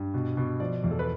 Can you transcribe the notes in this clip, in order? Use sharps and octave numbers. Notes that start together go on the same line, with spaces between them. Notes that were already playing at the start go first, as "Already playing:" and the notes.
Already playing: G2
B2
B2
F3 D5
E2
A4
B4